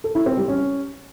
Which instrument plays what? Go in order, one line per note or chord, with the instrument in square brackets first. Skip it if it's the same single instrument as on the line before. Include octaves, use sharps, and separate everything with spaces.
[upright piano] A4
E4
C4
G3
C#4